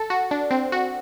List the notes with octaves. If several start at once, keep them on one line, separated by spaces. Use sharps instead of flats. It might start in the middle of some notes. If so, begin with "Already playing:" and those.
Already playing: A4
F#4
D4
C4
F#4